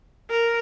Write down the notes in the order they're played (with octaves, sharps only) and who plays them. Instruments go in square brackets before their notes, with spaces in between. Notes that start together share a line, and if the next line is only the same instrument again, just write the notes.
[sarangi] A#4